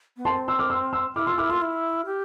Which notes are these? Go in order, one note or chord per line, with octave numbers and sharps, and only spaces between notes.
B3
C4 A5 C6
C6 E6
D6 F6
C6 E6
C6 E6
E4 D6 F6
F4 C6 E6
E4 D6 F6
F4 C6 E6
E4
G4